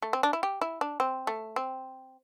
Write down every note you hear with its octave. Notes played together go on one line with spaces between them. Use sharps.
A3
C4
D4
E4
G4
E4
D4
C4
A3
C4